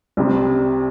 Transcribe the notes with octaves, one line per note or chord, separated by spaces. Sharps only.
C2 C3 G3